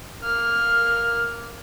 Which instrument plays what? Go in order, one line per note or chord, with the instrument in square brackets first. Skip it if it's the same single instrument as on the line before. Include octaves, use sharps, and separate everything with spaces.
[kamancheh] A#3 F6